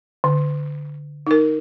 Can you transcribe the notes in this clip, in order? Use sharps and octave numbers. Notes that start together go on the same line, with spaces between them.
D3
D#4 A#4